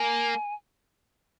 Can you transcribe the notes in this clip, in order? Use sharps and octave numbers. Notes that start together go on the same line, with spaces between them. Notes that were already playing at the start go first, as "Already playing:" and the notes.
Already playing: A#3 G#5